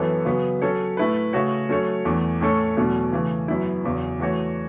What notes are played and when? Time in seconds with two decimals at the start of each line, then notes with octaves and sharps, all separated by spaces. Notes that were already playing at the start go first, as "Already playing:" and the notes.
Already playing: F#2 E3 B3 A4 C#5
0.25 C#3 F#3 B3
0.61 F#3 C#4 A4 C#5
0.97 A2 A3 E4 B4
1.33 C#3 A3 F#4 C#5
1.69 F#3 A3 C#4 A4 C#5
2.05 E2 E3 A3
2.41 A2 A3 C#4 A4 C#5
2.76 E2 B2 F#3 A3 C#4
3.12 C#3 E3 A3
3.48 F#2 F#3 B3 E4
3.84 E2 C#3 F#3
4.19 E3 A3 F#4 C#5